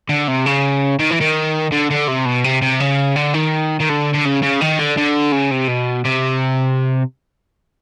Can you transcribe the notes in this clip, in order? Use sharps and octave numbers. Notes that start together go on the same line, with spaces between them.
D3
C3
C#3
D#3
E3
D#3
D3
D3
C3
B2
C3
C3
C#3
D3
D#3
D#3
D3
D3
C#3
C#3
D#3
D3
D3
C#3
C3
B2
C3